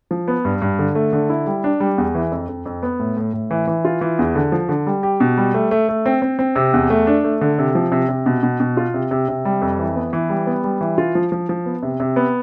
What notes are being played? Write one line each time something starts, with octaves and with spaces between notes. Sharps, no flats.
F3
B3
G2
G2
D3
A3
D3
E4
G3
D4
G3
E2
E3
F2
F2
F2
B3
A2
A2
A2
E3
E3
F4
E3
E2
D3
F3
D3
G3
G4
B2
G3
A3
A3
A3
C4
C4
C4
C3
E2
A3
D4
A3
D3
C3
F3
C3
C3
B2
B2
B2
F4
C3
C3
C3
G3
F2
E3
B3
E3
G3
B3
G3
E3
F4
F3
F3
F3
B3
C3
C3
B3